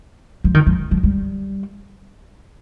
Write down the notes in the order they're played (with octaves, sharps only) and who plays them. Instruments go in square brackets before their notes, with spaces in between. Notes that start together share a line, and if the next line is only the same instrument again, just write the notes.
[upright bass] F3
D#3
F3
F3
G3